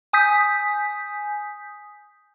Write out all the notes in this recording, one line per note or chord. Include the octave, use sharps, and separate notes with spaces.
G#5 D#6 G6 B6